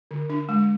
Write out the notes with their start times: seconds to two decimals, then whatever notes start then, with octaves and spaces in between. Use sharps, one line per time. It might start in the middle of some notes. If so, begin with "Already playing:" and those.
0.11 D3
0.30 D4
0.49 G#3